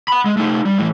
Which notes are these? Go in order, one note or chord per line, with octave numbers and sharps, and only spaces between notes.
F#5 B5
G#3
A3 D#4
G3
A2 E3